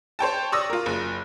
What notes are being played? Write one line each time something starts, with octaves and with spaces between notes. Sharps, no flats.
C5 C#5 G5 A5
D5 C#6 D#6 E6 A#6
F4 A#4
F#1